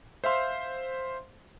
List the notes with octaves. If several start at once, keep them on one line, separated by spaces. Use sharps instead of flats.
C5 E5 F5 C6